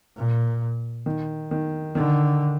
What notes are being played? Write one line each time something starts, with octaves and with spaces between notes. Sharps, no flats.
A#2
D#3
D#3
D3 D#3